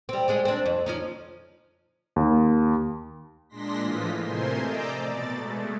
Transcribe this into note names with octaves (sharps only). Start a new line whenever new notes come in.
G3 C4
G3 G#3 G#4
C4 D4
F2
F3 C#4 D#4
D#2
A#2 G#3 D4 C6 A#6 B6
A2 E3 F3 F4 D#5 B6
C3 A3 A#4 C5 G#5 C6
D5 D#5 A#5 D6 E6 G6
B2 D5 A6
G#3 A3